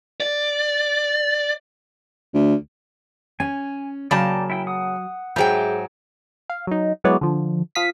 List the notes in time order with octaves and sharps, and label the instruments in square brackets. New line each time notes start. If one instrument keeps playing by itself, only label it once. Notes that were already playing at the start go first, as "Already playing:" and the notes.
[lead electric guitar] D5
[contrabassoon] D2
[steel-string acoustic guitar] C#4 [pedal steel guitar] G#5
[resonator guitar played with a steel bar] C#3 A#3 A5 [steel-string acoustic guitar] F#3 [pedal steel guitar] D5 G5 A#5
[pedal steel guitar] E4 G5
F#5 D#6
[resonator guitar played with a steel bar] G#2 F#3 G5 [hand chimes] G#4 G6 [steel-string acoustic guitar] C5 E5
[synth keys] F5
F#3 D#4
F#3 G#3 B3 E4 C#5 D5
D3 F3
F3 F5 D#6 B6